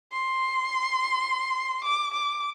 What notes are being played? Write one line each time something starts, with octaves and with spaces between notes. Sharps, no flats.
C6
D6
D6